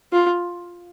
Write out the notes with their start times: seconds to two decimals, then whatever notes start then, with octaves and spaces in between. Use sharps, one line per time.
0.13 F4